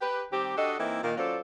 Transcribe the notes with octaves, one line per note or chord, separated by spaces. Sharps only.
G4 B4
D#3 G3 C4 G4
D4 F#4 G4 A4 D#5
E3 A#3 C4 D#4 E4
A#2 D#3 A#3
F#3 C#4 F4 A4 C5 D5